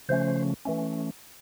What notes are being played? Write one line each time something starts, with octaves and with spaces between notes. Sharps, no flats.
C#3 F3 A3 C#4 C5
E3 A3 C#4